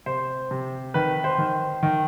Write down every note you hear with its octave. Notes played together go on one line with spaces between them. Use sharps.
C3 C5
C3
D#3 B4
C5
D#3
D#3